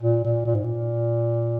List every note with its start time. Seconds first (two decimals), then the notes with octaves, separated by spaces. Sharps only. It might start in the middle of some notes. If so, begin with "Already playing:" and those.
0.03 A#2
0.25 A#2
0.45 A#2
0.55 G#2
0.64 A#2